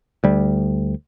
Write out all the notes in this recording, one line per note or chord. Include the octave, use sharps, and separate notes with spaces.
D2 G3